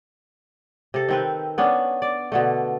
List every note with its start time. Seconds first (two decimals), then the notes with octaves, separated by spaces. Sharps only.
0.94 C3 A4
1.09 D#3 C4 B4
1.58 B3 C#4 D4
2.02 D5
2.32 B2 D3 A3